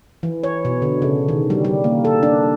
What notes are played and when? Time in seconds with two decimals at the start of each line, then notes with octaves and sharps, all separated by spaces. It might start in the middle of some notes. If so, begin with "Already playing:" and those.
0.23 E3
0.44 C#5
0.65 B2
0.82 D3
1.02 C#3
1.28 D#3
1.50 G3
1.65 G3
1.84 A#3
2.05 A4
2.23 D4